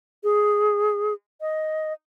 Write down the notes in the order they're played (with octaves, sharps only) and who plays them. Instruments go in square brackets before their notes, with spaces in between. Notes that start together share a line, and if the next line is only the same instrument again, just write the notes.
[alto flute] G#4
D#5